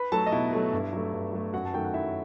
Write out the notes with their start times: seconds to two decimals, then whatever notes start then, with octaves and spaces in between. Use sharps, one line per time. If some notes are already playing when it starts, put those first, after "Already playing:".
Already playing: B4 B5
0.12 F#3 A3 A4 A5
0.27 D#5
0.32 B2 E4 E5
0.53 F#3 A3
0.73 G2
0.93 F#3 A3
1.14 G2
1.33 F#3 A3
1.53 F#2 F#4 F#5
1.65 A5
1.73 D#3 F#3 A3 G5
1.85 F#5
1.93 F#2 E4 E5